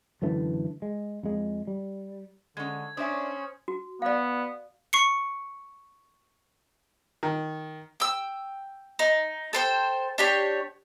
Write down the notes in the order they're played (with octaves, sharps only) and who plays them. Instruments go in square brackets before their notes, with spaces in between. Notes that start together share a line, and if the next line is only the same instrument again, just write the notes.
[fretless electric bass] F#2 D3 E3 A3
G#3
F2 G#3
G3
[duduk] D3 [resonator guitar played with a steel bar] G#3 C#4 [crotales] G#6
[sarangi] C#4 [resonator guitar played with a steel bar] D4 E5 [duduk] C5 [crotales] C#6 D#6
[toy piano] F#4
[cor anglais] B3 [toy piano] D5 F5
[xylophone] C#6 C7 C#7
[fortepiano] D#3
[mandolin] G5 E6
D#4
A4 C5 G5
D4 G4 C#5